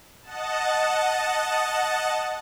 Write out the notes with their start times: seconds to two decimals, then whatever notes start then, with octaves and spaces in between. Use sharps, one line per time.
0.22 D#5 F#5 A5